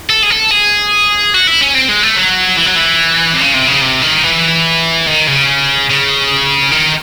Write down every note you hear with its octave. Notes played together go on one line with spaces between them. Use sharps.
A4
G#4
A4
G#4
F#4
E4
C#4
C4
G#3
A3
F#3
E3
F#3
E3
C3
C#3
C3
C#3
C3
D#3
E3
D#3
C#3
C#3
D#3